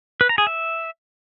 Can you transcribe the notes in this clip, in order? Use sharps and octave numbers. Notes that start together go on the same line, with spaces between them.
B4
A#5
G#4
E5